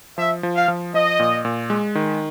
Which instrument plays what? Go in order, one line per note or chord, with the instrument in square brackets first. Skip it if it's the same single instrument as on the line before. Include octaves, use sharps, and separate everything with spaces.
[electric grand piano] F3 [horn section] E5
[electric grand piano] F3
[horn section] F5
[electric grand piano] F3
[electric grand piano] F3 [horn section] D#5
[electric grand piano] A#2
A#2
G#3
D#3